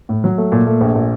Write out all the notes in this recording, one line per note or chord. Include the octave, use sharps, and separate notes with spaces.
A2
F#3
A3
A#2
A3
A#1
A#2